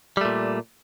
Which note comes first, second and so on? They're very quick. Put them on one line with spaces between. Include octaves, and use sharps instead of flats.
G3 A3 A#2